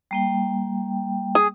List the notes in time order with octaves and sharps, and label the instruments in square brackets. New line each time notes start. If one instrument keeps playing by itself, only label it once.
[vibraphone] G3 A#3 G5
[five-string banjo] G#4